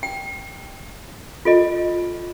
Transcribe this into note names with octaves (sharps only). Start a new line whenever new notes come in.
G5
F4 A4 D#5